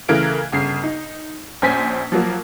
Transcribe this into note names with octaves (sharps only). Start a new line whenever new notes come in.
C#3 E3 A3 A#4 F5 D7
G1 C#3 C7
D#4
A#1 C#4 C5 G#5 B6
F3 F#3 A#3